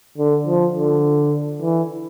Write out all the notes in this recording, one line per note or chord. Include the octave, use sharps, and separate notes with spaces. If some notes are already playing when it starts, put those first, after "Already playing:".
D3
F3
D3
E3